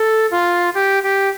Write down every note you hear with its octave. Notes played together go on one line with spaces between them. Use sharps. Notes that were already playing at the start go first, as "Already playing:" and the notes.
Already playing: A4
F4
G4
G4